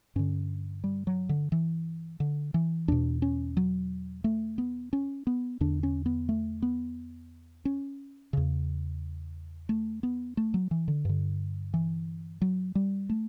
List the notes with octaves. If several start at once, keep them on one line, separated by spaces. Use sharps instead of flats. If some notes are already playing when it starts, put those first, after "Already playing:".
G2 D3 C#4
G3
F#3
D3
E3
D3
E3
E2 B2 D4
C#4
F#3
A3
B3
C#4
B3
E2 D3 D4
C#4
B3
A3
B3
C#4
E2 C#3
A3
B3
A3
F#3
E3
D3
G2 D3
E3
F#3
G3
A3